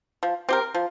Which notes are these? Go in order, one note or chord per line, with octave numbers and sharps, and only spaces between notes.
F3
C4 G4 A#4
F3